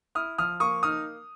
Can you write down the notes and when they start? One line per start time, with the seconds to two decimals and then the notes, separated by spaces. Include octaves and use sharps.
0.15 E4 D#6 F6
0.38 F3 D#6 F6
0.60 A#3 C#6 D#6
0.83 D#4 D#6 F6